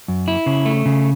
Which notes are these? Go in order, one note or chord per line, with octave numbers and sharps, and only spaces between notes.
F#2
E4
C#3
A3
C#3